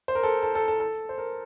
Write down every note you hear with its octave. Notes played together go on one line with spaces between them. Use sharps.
C5
A#4
A4
A4
A4
A4
A4
C5
A#4